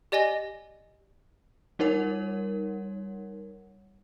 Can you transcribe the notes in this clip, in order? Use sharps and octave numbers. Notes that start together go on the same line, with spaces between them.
G4 D5 D#5 G#5 A#6 G7
G3 D#4 A#4 C#5 F#5